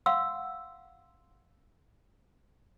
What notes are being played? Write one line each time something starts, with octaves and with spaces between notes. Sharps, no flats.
F5 F#5 C6 E6